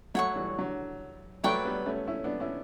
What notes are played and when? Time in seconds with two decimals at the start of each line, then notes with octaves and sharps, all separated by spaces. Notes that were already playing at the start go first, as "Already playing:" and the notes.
0.14 F#3 A3 C#5 F#5 C#6
0.36 E3 G3
0.58 D3 F#3
1.44 F#3 A3 B4 D5 G5 C#6
1.65 G3 B3
1.86 A3 C#4
2.08 C#4 E4
2.24 B3 D4
2.40 C#4 E4